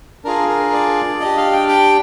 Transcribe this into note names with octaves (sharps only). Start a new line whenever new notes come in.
D4 F4 G#4 A#4
A#4
D5
D4 G4 D#5
F5
G5
G5